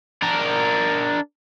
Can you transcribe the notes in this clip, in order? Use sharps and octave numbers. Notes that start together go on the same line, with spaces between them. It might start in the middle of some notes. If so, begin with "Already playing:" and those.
D4 A#4